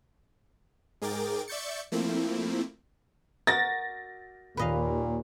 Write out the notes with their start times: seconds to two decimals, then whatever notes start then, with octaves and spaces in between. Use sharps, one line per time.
1.02 G#2 G#4 A#4 G5 D6 A6
1.48 D5 E5 C#6 G6 A6 C#7
1.92 F3 A3 A#3 C4 E4
3.47 F#4 A#4 D#5 A6 A#6
4.57 D#2 A#2 B4 D#5 F5